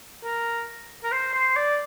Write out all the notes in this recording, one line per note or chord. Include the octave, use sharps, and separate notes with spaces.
A#4
A#4
C5
C5
D5